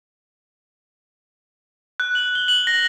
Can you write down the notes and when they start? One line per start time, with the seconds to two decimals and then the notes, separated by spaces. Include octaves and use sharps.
2.00 F#6
2.15 F#7
2.35 G7
2.48 F#7
2.67 A#6